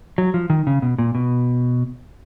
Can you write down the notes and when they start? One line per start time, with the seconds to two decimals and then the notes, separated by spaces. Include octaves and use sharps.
0.18 F#3
0.34 F3
0.50 D#3
0.67 C#3
0.82 B2
0.98 A#2
1.15 B2